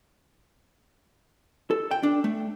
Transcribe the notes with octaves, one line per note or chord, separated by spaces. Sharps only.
A4
G5
D4
A3